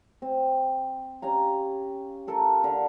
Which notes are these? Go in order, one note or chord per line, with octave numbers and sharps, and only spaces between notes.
C4
C#4 G4 F5 A#5
F4 A4 A#4
D3